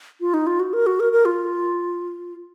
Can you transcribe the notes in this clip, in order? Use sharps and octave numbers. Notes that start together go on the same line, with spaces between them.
F4
D#4
F4
F#4
A#4
F#4
A#4
A#4
F4